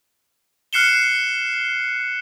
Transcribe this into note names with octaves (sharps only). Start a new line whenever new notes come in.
F6 F#6 C7 C#7 E7 G7